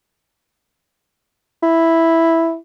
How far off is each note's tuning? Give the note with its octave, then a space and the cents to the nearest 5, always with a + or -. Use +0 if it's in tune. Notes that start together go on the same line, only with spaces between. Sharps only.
E4 +0